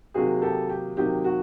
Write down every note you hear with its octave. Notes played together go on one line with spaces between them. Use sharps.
C3 D#3 F#3 A#3 D#4 F#4 G#4
G4 A4
G4
C3 D#3 F#3 A#3 D#4 G4
F#4